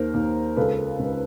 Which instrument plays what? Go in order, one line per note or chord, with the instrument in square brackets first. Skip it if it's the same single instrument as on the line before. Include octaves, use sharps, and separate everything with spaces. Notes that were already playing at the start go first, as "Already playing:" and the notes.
Already playing: [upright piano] D#2 A#4 C5
D#2
C#2 A4 B4
C#2